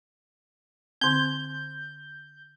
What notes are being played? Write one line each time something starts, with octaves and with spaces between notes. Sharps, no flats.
D3 C4 G6